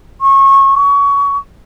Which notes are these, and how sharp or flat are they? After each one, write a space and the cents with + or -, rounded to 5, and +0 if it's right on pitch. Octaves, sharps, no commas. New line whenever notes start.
C#6 -25
C#6 +25